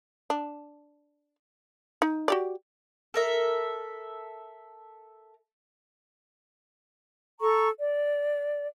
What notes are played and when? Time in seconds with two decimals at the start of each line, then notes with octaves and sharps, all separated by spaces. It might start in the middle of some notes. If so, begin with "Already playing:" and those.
0.30 D4
2.02 D#4
2.28 F#4 G4 D5
3.14 A4 A#4 E5
7.40 A4 A#5 C#6
7.78 D5